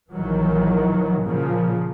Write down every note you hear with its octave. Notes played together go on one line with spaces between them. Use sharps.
A#1 D#3 E3 F#3
A#2 C#3 F3